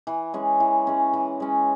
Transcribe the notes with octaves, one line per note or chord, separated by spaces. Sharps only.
E3
G#3 C#4
E3
G#3 C#4
E3
G#3 C#4